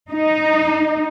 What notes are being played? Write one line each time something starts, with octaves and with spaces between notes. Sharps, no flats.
D#4